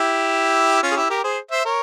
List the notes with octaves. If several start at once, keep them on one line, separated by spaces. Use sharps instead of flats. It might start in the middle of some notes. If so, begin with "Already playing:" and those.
Already playing: E4 G4
C#4 F4
G#4
E4 G4
G4 A#4
G#4 C5
C5 E5
A#4 C#5